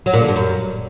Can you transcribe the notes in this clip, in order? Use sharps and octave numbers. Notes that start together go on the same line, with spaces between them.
F#3
A#2
D3
G2
F#2